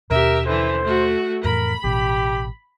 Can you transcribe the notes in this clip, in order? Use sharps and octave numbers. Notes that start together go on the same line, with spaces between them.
D#2 B2 C#4 G4 A#4 E5
D3 E3 C5
A3 F#4
F2 A2 E3 A#4 B5
A1 B2 G4